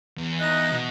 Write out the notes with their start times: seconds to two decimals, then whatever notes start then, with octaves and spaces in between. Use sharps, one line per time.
0.18 E2
0.40 D#4 D#5 F#6
0.72 B2